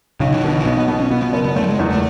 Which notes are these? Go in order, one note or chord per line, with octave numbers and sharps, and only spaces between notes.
B1 C#3
E3
B2 D3
E3
B1 B3
B3
B2 B3
C#4
B2 B3
B3
F#1 B3
B3
F#1 A3
F#3
G#3
E2
A3